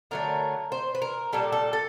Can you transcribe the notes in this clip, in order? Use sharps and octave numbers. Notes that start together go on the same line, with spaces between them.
D3 F#3 A3 A#4
C5
B4
A#4
A#2 G3 A4
A4
A4